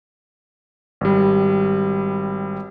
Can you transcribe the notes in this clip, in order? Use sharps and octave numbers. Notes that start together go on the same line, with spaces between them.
G#1 G3